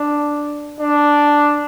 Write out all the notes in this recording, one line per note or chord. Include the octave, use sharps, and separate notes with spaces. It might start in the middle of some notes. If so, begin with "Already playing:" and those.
Already playing: D4
D4